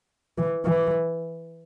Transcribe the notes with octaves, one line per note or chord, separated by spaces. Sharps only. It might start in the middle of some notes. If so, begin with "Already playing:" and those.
E3
E3